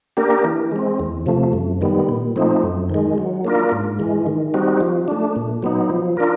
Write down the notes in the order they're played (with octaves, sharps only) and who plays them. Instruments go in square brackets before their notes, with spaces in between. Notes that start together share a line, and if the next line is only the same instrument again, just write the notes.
[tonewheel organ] A#3 D4 G4 A#4
E3
G#3 C4
E2
C3 F3 A3
F#2
D#3 G3 B3
A#2
F3 A3 C4 D#4
F#2
D#3 G#3
F#3
A#3 D4 F4 A#4
G#2
E3 G#3
D#3
G3 C4 D#4 F#4
F3
A3 D4
A#2
F#3 B3 D#4
F3
D4 F4 A#4